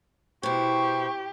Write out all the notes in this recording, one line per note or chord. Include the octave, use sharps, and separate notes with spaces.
B2 E4 G4 C5 C#6